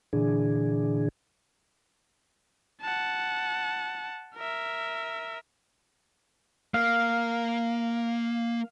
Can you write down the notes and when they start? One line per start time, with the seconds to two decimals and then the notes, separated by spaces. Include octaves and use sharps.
0.13 A#2 D3 E3 D4 G#4
2.81 F#5 A5
4.36 A#4 E5
6.74 A#3 F5